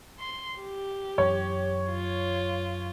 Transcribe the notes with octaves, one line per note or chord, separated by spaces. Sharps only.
C6
G4
F#2 E3 C#5
F4